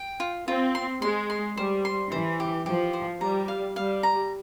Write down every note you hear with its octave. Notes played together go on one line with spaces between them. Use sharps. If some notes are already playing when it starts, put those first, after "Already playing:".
Already playing: G5
F4
C4 F4
C6
G#3 C6
C6
G3 C5
C6
E3 C5
G4
F3 G4
C5
G3 A#5
F5
G3 F5
A#5